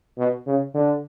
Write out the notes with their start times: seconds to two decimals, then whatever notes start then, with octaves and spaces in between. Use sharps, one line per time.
0.18 B2
0.46 C#3
0.75 D3